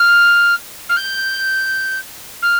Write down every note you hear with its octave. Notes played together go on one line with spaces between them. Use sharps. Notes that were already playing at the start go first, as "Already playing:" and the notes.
Already playing: F6
F6
G6
F6